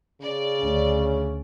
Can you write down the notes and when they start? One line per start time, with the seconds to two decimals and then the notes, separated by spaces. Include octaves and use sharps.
0.21 C#3 D5
0.60 D2 C#4